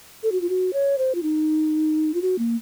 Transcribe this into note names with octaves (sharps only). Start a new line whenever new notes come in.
A4
F#4
F4
F#4
C#5
C5
F4
D#4
F4
F#4
A#3